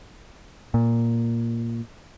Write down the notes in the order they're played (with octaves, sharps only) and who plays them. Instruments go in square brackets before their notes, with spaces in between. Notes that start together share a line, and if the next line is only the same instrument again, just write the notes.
[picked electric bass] A#2